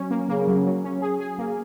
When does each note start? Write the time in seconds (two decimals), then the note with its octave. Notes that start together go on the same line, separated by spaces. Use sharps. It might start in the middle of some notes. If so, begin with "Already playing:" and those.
Already playing: F#3 C#4
0.11 A#3
0.29 C#3 A#3
0.48 F#3
0.66 F#3
0.84 C#4
1.02 G#4
1.20 G#4
1.38 A#3